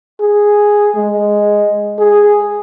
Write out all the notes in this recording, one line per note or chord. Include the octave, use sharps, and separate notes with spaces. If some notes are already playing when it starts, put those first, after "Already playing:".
G#4
G#3
G#4